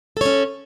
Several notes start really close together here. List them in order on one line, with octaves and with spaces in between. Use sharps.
A4 C#5 C#4